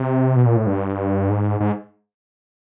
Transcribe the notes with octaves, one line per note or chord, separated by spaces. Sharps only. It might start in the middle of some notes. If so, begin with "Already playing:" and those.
Already playing: C3
B2
A#2
A2
G2
G#2
G#2